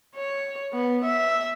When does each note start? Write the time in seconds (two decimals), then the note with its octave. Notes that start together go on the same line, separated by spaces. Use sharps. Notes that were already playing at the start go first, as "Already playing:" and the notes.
0.15 C#5
0.73 B3
1.04 E5